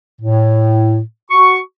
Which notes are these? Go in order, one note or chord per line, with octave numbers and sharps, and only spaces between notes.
A2
F#4 C#6